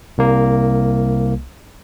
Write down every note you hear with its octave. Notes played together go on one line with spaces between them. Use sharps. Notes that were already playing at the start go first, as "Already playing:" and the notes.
C2 A#3